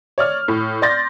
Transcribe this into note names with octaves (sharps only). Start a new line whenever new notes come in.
C#5 D5 F6
A2
D5 C6 G6 A6 A#6